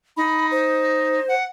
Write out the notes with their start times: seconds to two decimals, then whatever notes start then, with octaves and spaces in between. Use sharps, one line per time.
0.17 D#4 B5
0.51 C5
1.28 F#5